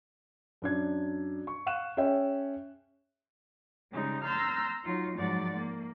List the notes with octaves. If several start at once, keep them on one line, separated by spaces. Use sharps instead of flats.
F#2 D4 G#6
C#6
F5 F#5 C#6 F#6 E7
C#4 G#4 C#5 E5 G5
C#3 G3 G#3 D#4
A#5 C6 E6 F6 G6 A6
F#3 D#4 F4
G#2 F3 F#3 D5 F#5 A6
A#3